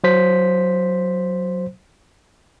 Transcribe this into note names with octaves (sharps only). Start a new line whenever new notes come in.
F#3 C5 B6